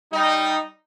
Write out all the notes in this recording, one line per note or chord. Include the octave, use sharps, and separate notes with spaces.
G3 D#4